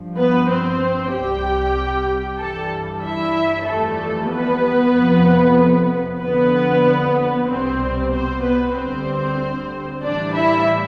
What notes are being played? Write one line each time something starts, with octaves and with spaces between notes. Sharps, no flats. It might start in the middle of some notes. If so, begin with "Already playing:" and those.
Already playing: G2 F3
B3 B4
C4 C5
C2 C3 G3 G4 G5
G2 E3 G3 A4 A5
E4 E5
F2 E3 G3 A3 A4
B3 B4
F2 C3 F3
F2 D3 F3 B3 B4
C2 B2 G3 C4 C5
C4 C5
B3 B4
D2 D3 G3 C4 C5
A2 E3 G3 D4 D5
E4 E5